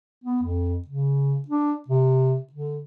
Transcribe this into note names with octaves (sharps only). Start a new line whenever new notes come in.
B3
F2
C#3
D4
C3
D3